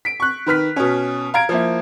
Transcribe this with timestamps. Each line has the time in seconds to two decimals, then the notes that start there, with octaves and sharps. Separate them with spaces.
0.05 B6 D7
0.20 C#6 F#6
0.46 D#3 B4 F6 B6
0.76 B2 C#4
1.34 F5 A#5 G#6 D7
1.49 F3 A#3 E4